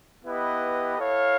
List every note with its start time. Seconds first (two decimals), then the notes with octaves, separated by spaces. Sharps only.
0.24 B3 E4 G4 B4 D#5
0.98 E4 A4 C#5 F5